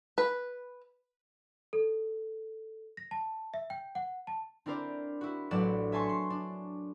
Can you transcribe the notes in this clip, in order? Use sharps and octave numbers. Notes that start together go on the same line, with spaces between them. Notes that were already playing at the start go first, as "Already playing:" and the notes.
B4
A4
A#6
A5
E5
G5
F#5
A5
C4 D4 E4 A#4 C5 D5
E4 F#4
A1 F#3 D4 D5 F#5 E7
E5 G#5 A5 C6 C#6
C6
D4